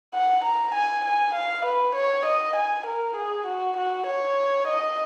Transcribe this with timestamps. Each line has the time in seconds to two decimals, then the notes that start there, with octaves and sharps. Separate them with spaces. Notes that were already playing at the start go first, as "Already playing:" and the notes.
0.14 F#5
0.44 A#5
0.75 G#5
1.05 G#5
1.35 F5
1.65 B4
1.95 C#5
2.26 D#5
2.56 G#5
2.87 A#4
3.17 G#4
3.47 F#4
3.77 F#4
4.07 C#5
4.68 D#5